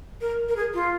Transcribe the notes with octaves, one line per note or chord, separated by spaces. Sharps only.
A#4
A#4
G#4
F4